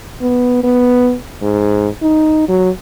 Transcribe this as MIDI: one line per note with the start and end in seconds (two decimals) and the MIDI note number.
0.22 0.63 59
0.64 1.15 59
1.42 1.88 44
2.02 2.45 63
2.49 2.70 54